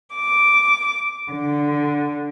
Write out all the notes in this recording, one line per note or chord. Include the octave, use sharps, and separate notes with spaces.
D6
D3